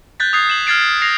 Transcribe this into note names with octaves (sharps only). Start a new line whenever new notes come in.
F#6 G6 A6 B6
D#6 F#6 G#6 C7
E7 F#7
F6 G#6 A6 C7 D7
A6
A#6 C7 F7